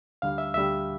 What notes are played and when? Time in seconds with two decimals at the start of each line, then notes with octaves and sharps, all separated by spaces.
0.22 D2 D3 G3 F5
0.38 E5
0.54 D2 D3 G3 E5